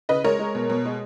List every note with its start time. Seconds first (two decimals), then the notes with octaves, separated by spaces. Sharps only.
0.09 C#3 B4 D#5
0.24 G#3 A#4 C#5
0.39 G#3
0.55 B2
0.70 B2
0.85 G#3